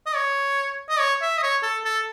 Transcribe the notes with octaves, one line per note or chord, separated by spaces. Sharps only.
D#5
C#5
D#5
C#5
E5
D#5
C#5
A4
A4